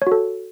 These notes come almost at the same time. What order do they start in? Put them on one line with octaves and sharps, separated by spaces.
C#5 F#4 A4